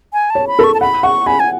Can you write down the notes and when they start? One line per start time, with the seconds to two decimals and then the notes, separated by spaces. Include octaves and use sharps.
0.13 G#5
0.30 A5
0.35 C#5
0.47 B5
0.59 A4
0.64 C#6
0.74 A5
0.81 F#5 B5
1.03 F#5 C#6
1.26 G#5 B5
1.40 G#5